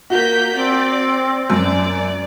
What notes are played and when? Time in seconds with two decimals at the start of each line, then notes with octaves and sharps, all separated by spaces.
0.10 A#3 F#4 G6 B6
0.55 C4 D5
1.50 F#2 D5